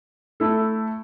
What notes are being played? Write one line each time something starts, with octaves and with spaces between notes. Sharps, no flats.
A3 E4 A4